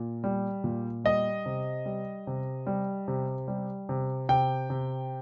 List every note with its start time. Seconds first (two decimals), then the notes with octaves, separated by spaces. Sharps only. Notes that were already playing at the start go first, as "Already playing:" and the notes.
Already playing: A#2
0.24 G3
0.64 A#2
1.04 G3 D#5
1.46 C3
1.85 G3
2.27 C3
2.67 G3
3.08 C3
3.48 G3
3.89 C3
4.29 C3 G5
4.70 C3